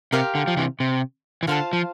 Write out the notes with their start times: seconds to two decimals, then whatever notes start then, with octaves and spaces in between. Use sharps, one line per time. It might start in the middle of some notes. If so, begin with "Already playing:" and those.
0.12 C3 G4 A#4 F5 C6
0.35 D3
0.47 F3
0.57 C3 E3
0.80 C3
1.43 E3
1.47 D3 F4 C5 F5 A5
1.73 F3